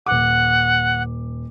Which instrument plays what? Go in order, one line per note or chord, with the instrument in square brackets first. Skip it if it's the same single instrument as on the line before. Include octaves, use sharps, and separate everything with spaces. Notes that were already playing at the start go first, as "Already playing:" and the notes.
[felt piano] D#1 D6 [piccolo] F#5